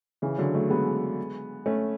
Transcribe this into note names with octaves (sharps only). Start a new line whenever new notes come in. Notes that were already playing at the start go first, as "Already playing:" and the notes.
C#3 E3
D3 F#3
F#3 A3
G#3 B3
A3 C#4